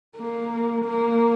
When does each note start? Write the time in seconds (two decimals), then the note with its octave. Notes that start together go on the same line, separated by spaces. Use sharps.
0.17 A#3
0.85 A#3